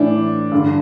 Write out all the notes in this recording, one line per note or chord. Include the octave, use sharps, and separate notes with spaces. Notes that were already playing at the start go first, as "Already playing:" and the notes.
Already playing: A2 E3 D4
G2 D3